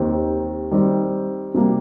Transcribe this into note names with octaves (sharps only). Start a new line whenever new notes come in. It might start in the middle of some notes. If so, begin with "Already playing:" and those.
Already playing: D#2 D#3 C4 G4
D#3 G3 C4 G4
C3 G3 A#3